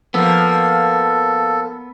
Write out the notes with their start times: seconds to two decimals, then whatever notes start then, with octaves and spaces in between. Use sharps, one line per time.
0.14 F3 A#3 B3 A4